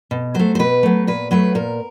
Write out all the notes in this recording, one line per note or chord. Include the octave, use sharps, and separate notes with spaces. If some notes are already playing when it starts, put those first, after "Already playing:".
B2
F#3 A3 C5
C5
B2 B4
F#3 A3
A#2 B4
F#3 A3 B4
A#2 A#4